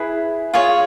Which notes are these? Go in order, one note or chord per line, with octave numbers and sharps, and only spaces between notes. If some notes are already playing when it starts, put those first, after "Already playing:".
Already playing: E4 G#4 B4
F4 G#4 C#5